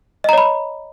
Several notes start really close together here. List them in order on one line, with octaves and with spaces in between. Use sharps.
D#5 A#5 C#5 B5